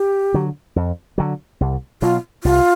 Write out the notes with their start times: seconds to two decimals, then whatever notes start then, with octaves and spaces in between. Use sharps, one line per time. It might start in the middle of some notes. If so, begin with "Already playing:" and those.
Already playing: G4
0.34 D3 F#3
0.76 F2
1.18 D3 F#3
1.61 C2
2.02 B2 F#3 F4
2.44 C2 F4